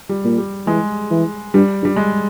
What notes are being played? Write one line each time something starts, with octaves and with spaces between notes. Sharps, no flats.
G3
A#2
G3
E3 G#3
E3
G2 G3
G2 G3
G#3